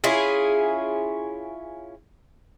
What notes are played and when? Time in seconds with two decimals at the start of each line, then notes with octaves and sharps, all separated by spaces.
0.04 C#4 E4 F4 G#4